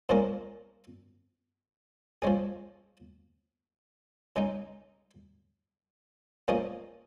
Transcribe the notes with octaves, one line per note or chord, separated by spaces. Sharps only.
A#2 F3 G#3 C#4 A#4
F3 G#3 C#4 G#4
C#3 G#3 D#4
F3 A#3 C#4 G#4 D#5